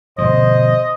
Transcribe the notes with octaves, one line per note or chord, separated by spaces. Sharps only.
B2 D3 F3 C5 D#5